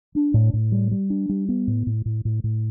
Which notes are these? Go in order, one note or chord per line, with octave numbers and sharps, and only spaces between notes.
D4
A2
A2
G3
G3
D4
G3
B3
A2
A2
A2
A2
A2